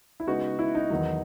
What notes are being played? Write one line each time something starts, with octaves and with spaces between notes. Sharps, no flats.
E4
C#3 G#3 B3 D#4 F#4
E4
D#4
E2 D#3 F#3